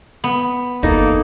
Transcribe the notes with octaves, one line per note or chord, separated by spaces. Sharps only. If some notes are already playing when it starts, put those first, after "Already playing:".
B3
G1 E2 A#3 D#4 A4